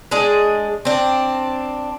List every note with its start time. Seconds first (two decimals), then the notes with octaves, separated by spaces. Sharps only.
0.11 G#3 D4 G#4
0.85 C4 D4